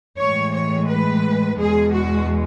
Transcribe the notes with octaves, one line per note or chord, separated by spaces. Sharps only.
A2 E3 G#3 C#5
C#5
B4
E2 B2 G#3 G#4
F#4